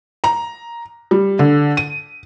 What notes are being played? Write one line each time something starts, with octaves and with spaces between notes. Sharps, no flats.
A#5
G3
D3
D#7